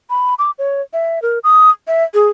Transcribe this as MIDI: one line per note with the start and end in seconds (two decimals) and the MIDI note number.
0.10 0.34 83
0.39 0.51 86
0.59 0.82 73
0.93 1.22 76
1.22 1.39 70
1.44 1.70 87
1.87 2.04 76
2.14 2.29 68